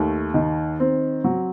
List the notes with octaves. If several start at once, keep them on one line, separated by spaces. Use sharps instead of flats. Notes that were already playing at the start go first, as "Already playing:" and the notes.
Already playing: D#2 A3
D#3
C4
F#3